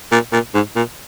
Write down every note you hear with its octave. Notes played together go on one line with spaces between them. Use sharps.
A#2
A#2
G#2
A#2